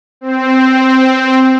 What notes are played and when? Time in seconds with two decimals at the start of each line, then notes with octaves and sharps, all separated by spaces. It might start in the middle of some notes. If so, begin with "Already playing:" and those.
0.21 C4